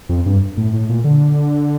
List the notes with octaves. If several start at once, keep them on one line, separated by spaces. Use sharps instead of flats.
F2
G2
A2
A2
A#2
D3